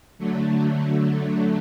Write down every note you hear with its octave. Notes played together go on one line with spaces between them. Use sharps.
D3 F#3 A3